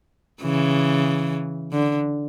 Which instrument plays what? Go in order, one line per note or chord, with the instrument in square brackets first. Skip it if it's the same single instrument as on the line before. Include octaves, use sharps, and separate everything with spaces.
[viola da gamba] C#3 E3
D3